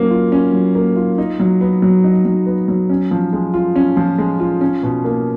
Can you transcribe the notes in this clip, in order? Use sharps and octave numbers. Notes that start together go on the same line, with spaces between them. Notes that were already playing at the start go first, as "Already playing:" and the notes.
Already playing: F#3 A#3 C#4
F4
C#4
F#3
A#3
F4
D#4
F#3
B3
F#3
D#4
F#3
B3
F#3
C#4
F3
G#3
F4
C#4
F3
G#3
F4
C#4
B2
A#3